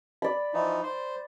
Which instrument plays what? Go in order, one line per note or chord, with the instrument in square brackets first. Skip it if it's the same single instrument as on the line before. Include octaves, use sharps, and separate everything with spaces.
[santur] D5 B5
[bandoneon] E3 F3 D#4
C5